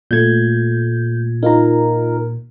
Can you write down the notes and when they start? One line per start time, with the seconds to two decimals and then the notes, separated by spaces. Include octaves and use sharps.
0.11 A#2 A3 G6 G#6
1.43 D#4 F4 A#4 A#5